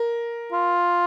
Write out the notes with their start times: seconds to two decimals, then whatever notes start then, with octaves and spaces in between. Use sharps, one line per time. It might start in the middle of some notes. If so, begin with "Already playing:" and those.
Already playing: A#4
0.53 F4